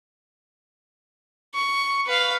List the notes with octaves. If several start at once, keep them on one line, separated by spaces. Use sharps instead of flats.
C#6
B4 F5